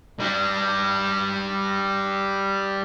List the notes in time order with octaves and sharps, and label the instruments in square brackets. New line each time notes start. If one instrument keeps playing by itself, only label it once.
[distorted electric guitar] G3 D4